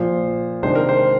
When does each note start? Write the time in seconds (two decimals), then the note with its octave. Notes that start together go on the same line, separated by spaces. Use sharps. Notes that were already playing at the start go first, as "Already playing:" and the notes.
Already playing: A#2 F3 A#3 C5
0.63 C3 D#3 G#3 D4 C5
0.75 A#4
0.89 C5